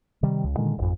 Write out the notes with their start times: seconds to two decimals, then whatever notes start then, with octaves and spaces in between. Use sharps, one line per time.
0.23 C3 D#3 G3
0.44 C#2
0.57 A#2 D3 D#3 G#3
0.78 D#1 G#1 F2